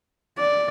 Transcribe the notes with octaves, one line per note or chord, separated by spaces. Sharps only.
D5